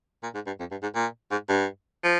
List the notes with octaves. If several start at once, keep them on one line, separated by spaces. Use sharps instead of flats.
A#2
G#2
G2
F2
G2
G#2
A#2
G#2
G2
F3